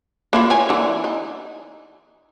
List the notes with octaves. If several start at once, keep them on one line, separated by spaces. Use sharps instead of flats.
A#3 E4 F4
A#4 C#5 G#5
D3 E3
D#4